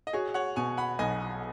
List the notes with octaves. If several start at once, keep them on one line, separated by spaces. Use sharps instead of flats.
D#5
F#4 G#4 C#5
C#5 F#5
B2 G#5 C#6
F#5 B5
B1 D#5 G#5